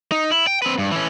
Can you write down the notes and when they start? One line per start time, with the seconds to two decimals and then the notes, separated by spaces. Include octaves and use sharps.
0.12 D#4
0.32 E4
0.47 G5
0.62 C4 B4
0.79 G2
0.92 E3 C#4